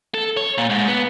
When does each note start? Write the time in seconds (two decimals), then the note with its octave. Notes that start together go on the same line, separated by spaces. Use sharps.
0.14 A4
0.37 C#5
0.58 A#2
0.70 G#2
0.88 B3